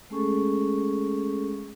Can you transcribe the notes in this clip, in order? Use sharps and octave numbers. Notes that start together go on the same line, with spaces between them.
G#3 A3 C#4 G#4 A4 C#6